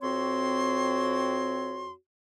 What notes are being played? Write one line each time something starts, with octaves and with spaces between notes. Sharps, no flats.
F2 C4 F#4 C#5 C6